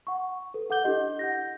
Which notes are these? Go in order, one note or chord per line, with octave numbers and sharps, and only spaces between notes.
F#5 C#6
A4 B4
A4 F#5 D6 G6 G7
D4 E4 G4 D#5
F#5 G6 A#6